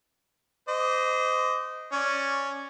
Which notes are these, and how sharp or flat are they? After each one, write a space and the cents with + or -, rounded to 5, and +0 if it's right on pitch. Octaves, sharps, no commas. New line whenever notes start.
C5 -30 D#5 +0 D6 -20
C#4 +0 D5 +0